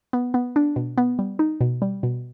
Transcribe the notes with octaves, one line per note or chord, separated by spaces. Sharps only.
B3
B3
D4
B2
B3
G3
D#4
B2
G3
B2